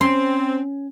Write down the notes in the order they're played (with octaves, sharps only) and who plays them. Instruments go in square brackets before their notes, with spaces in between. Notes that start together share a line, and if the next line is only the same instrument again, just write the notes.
[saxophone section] C4 [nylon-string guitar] C#4 [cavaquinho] C6